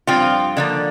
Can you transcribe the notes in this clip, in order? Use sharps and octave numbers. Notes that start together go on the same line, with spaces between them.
G2 F3 C4 F4
D3 F3 A#3